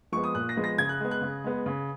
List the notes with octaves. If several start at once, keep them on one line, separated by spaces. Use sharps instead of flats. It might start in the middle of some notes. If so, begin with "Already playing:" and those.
F3 G#3 B3 C#6
D#6
A#2 F#6
A#6
F3 G#3 B3
A#6
C#3 G#6
F#6
G#3 B3
F#6
C#3
G#3 B3
C#3